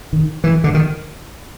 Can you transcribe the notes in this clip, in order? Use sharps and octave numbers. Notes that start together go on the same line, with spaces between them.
D#3
E3
D3
D#3